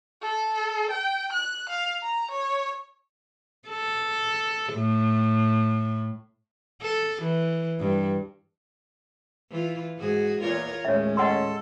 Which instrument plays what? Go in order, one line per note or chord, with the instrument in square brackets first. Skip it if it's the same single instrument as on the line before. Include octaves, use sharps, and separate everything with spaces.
[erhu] A4
G5
F#6
F5
A#5
C#5
[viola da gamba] A4
A2
A4
E3
G2
E3 F4
G#2 F#4 G#4
[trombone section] E2 A#2 [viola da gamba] F4 A#4 C#5
[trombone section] D#2 C#4 [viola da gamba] A2 G#3 [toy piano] C#5 E5
[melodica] A4 [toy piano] D#5 F#5 C6